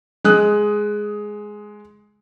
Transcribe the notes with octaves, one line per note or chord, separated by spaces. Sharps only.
G#3 D#6 F#6